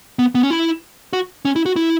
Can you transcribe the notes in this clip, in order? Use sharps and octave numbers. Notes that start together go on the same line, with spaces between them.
B3
B3
C#4
E4
F#4
C#4
E4
F#4
E4